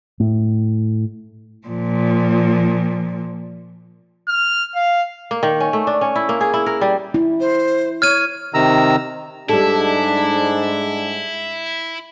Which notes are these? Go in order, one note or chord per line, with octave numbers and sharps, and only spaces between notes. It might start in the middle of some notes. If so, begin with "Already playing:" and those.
A2
A#2 F3
F6
F5
A#3
D#3
C#4
A3
D4
C#4
E4
A#3
G#4
E4
A#4
G3
E4
C5
C#5 F6 G#6 D#7
C3 D#3 A#5 E6
G#2 G3 D4 E4 A4